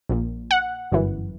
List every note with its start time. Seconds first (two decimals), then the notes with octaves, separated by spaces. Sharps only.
0.09 A#1 A#2
0.51 F#5
0.92 G1 F#2 E3